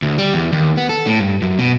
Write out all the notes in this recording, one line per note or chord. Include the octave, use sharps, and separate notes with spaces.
D2
G3
E2
D#2
B3
A4
A2
G2
F#2
B2